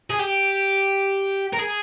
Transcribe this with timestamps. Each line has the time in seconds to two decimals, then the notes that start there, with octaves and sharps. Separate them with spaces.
0.10 G#4
0.19 G4
1.53 A#4
1.59 G#4